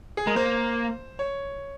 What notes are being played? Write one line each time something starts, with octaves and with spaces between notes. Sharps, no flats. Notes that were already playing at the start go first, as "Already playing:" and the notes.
G#4
G#3 A#4
A#3 C5
C#5